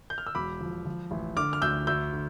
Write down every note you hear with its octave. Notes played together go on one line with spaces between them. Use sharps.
G6
F6
E6
E1 B5 D6
F3
F3
A1
D3 D6 F6
F6
D2 E6 G6
D2 E6 G6
D3